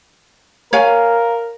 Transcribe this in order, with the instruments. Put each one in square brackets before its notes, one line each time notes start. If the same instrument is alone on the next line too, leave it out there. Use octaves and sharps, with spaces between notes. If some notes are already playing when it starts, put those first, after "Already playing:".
[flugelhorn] A#4 [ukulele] C#5 F5 G#5